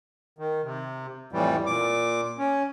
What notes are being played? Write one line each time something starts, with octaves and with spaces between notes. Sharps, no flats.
D#3
C3
F2 A2 E3 G3
A#2 D6
C#4